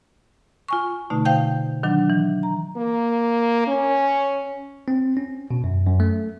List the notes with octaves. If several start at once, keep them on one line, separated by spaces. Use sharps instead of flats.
F4 G#5 C#6
B2 D3 A3 D#4
C5 F5 G5 G6
D#3 F#3 D4
E3
A#5
A#3
C#4
C4
C#4
B2
F#2
F#2
A3